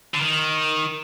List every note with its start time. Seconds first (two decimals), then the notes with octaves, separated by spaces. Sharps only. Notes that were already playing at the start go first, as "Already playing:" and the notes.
0.15 D3
0.22 D#3